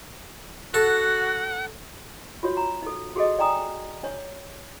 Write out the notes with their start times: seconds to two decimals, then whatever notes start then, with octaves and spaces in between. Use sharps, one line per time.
0.74 F#4 A4 F#5
2.43 F4 F#4 C#5
2.57 A#5
2.83 D#4 A4
3.16 F#4 G#4 A4 D#5
3.39 D5 G5 G#5 A#5 D#6
4.03 D4 C#5